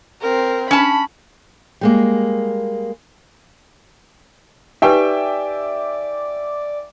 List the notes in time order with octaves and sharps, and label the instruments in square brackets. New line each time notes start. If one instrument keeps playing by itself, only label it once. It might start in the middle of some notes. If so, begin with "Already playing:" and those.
[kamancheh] C4 A#4
[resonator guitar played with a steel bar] C#4 A5 [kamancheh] B5
[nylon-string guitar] G3 G#3 A#3
[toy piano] D#4 G4 B4 [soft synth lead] D5 [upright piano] E5 G5 G#5